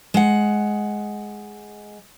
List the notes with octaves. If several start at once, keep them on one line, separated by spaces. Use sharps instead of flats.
G#3 F#5